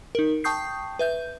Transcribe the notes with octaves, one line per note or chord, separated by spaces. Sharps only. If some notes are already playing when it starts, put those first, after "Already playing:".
D#4 A#4
G5 A5 C#6 D#6 G6 C7
B4 E5 G6